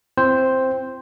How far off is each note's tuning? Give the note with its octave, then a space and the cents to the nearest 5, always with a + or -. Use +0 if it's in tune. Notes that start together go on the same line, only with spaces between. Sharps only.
C4 +0 E4 +40 C5 +0